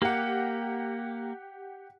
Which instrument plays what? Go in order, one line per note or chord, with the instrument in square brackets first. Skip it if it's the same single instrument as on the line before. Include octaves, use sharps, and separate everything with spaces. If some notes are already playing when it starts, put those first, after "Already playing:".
[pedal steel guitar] A#3 [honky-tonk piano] G4 F#5